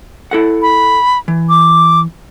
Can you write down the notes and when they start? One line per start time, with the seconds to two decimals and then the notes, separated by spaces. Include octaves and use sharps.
0.31 E4 A4 F#5
0.62 B5
1.28 E3
1.49 D6